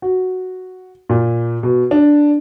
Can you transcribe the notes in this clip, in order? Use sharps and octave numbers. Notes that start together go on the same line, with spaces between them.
F#4
A#2
B2
D4